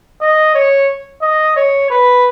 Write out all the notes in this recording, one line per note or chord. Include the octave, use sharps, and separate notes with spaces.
D#5
C#5
D#5
C#5
B4